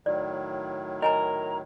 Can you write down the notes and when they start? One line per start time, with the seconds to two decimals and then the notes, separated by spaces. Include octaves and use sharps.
0.06 A2 D#3 F#3 D5
1.02 A#4 D#5 G#5 A#5